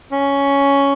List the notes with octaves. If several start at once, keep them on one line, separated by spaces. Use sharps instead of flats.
C#4